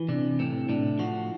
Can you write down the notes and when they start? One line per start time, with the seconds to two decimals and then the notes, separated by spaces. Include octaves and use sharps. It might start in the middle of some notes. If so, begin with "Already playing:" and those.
Already playing: E3
0.08 C3 D4
0.39 A2 C4
0.69 A2 D4
0.99 F3 F#4